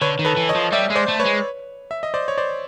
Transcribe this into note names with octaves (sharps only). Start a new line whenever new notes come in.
D3 B4 C#5
D#3
A4 B4
E3
C#5 D#5
F3
G3 D5 E5
G#3
C5 D5
A3
B4 C#5
G#3
E5
D#5
C5 D5
C#5
C5 D5